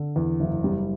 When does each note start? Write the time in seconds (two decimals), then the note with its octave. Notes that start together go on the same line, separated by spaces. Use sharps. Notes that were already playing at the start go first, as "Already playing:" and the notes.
Already playing: D3
0.16 E2
0.40 F#1
0.64 G3